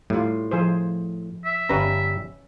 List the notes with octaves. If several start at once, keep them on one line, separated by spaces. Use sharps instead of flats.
A2 G3 F4
F3 G#4 C5
E5
G1 G3 C#4 B4 A#5